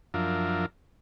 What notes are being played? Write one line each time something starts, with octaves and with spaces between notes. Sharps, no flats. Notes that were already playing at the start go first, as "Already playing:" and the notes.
F#2 F3 D4 F4 A#4 E5